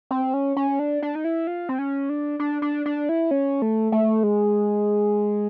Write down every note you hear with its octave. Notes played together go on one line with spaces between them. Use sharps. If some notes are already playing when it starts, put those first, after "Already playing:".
C4
C#4
C#4
D4
D4
D#4
E4
F4
C4
C#4
D4
D4
D4
D4
E4
C#4
A3
A3
G#3